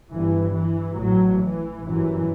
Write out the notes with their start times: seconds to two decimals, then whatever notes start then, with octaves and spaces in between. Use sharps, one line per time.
0.11 G1 G2 E3
0.54 E3
0.97 A1 A2 F#3
1.40 E3
1.83 G1 F#2 E3